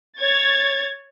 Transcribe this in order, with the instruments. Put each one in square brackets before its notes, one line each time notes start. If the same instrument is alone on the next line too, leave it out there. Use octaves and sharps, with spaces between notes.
[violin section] C#5 G#6 A6